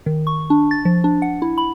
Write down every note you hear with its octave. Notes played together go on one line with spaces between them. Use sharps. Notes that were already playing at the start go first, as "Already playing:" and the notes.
D#3
C#6
D4
A6
F3
D4
F#5
E4
B5